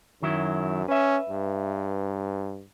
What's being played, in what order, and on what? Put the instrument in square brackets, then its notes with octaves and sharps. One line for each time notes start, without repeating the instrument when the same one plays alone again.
[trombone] F#2 [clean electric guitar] D#3 F#3 E4
[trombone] C#4 [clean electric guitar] B4 E5
[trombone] G2